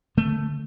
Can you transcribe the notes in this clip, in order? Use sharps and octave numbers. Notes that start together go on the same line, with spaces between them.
D3 A3